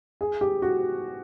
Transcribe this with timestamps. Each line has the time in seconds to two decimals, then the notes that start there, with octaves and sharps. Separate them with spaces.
0.21 G#4
0.41 G4
0.62 F#4